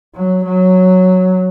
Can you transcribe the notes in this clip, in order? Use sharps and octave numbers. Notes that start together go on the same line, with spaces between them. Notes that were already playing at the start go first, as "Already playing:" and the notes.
F#3
F#3